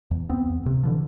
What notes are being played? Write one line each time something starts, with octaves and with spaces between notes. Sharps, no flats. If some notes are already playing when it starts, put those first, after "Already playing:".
E2
C#2 B3 C4
E2
D1 C3
D3 E3 F3